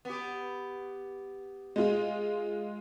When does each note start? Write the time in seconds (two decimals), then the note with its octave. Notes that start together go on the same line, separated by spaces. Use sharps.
0.05 B3 G4
1.76 G#3 F4